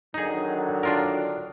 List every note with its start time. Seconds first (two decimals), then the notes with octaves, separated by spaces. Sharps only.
0.14 D3 D#3 F#3 D#4 G#4
0.83 D4 F4 A#4